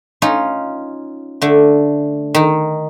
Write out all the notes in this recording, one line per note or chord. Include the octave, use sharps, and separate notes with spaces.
C#4 D#4 F4
D3 A3
D#3 D#4